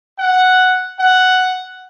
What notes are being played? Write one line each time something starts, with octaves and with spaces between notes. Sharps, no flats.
F#5
F#5